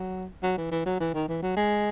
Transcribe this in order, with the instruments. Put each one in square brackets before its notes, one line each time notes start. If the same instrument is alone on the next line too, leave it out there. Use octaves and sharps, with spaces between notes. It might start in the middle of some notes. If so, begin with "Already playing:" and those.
Already playing: [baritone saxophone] F#3
F#3
E3
E3
F#3
E3
D#3
E3
F#3
G#3